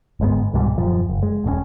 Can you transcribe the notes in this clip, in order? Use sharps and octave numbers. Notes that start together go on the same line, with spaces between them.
G1 G#2 G#3 B3
C2 G#2 B2 G3
D#1 F#2 F3
F#1
G#3
E1 A2 C3 C#4